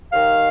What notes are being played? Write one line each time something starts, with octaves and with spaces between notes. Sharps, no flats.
D#2 D#3 F5